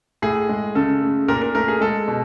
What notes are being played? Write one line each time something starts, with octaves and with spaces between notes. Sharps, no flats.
A2 G#4
G#3
C#3 A4
A3
A#2 A#4
A#4
A3 A#4
G#4
G#3 A4
B2